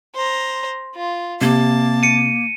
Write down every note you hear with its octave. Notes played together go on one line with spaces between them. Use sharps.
C5 A#5
F4
C3 A#3 A5
C#7 D#7